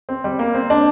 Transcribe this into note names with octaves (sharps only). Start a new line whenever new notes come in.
C4
G3
A#3
C4
D4